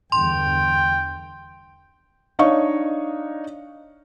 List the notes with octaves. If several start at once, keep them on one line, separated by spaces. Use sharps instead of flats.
E2 G2 D3 G5 C6
D4 D#4 C#5 D#5 F5 C#6